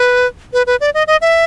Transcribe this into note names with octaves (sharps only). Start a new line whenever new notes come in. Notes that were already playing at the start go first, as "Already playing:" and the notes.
Already playing: B4
B4
B4
D5
D#5
D#5
E5